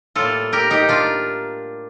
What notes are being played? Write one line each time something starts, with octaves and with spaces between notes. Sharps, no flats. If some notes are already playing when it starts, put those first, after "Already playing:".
A2 G3 A#3 F4 A4
G4 A#4
D#4 G4
D4 F4